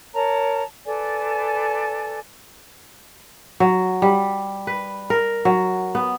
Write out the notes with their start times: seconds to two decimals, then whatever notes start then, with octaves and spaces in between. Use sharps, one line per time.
0.13 A#4 C#5 A5 A#5
0.86 A4 B4 D5 G#5
3.60 F#3
4.02 G3
4.67 B4
5.10 A#4
5.45 F#3
5.95 B3